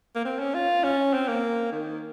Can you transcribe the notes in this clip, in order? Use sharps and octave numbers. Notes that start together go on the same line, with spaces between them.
A#3
C4
C#4
F4
C#4
C4
A#3
D#3